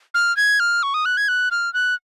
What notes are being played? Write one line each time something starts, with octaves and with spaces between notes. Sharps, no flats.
F6
G#6
F6
C#6
D#6
F#6
G#6
F#6
F6
F#6